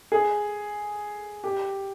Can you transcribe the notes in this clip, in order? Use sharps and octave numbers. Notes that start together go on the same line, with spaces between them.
G#4
G4